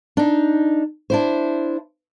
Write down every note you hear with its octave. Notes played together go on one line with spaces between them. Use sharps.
D4 D#4
D4 E4 C5